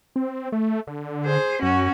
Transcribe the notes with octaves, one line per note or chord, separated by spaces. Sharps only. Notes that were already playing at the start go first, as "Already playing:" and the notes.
C4
A3
D3
G#4 C5
F#2 C#4 F#4